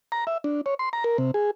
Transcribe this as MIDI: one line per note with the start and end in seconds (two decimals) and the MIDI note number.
0.12 0.24 82
0.27 0.38 76
0.44 0.61 62
0.66 0.74 73
0.79 0.89 84
0.93 1.04 82
1.04 1.17 70
1.18 1.31 48
1.34 1.51 68